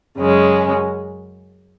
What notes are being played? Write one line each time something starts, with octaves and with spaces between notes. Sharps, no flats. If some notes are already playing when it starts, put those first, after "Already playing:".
F#2 C#3 G#3 C#4